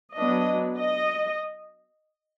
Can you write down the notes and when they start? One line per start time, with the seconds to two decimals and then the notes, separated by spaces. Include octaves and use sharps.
0.17 F#3 B3 D4 D#5
0.78 D#5